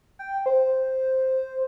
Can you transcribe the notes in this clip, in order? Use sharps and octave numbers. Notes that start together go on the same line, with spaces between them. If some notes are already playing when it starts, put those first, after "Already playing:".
G5
C5